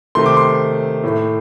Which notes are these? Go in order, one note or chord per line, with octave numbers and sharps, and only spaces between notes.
C3 D#3 A3 C6
D6
C6
A2 A3